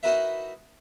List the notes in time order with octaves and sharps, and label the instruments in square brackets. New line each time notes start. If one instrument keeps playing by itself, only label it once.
[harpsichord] D#4 E4 F#4 A#4 B4 E5